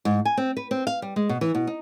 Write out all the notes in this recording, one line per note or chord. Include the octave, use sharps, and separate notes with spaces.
G#2
G#5
C4
B4
C4
F5
G3
G#3
B2
E3
B2
D#4